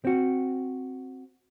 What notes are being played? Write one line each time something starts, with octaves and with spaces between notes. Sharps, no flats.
C4 F#4